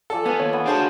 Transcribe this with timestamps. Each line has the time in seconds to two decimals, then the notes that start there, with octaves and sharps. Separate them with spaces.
0.10 F3 A4 D5 G#5
0.26 B3 F5 G#5
0.40 D#2 C#5
0.53 B3
0.66 D4 F#4 G#4 C5 F5 A5